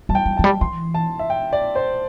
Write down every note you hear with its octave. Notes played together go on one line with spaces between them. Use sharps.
G3 A5
G5
G3
E3 A5
G3
E3 C6
A5
E5
G5
D5
C5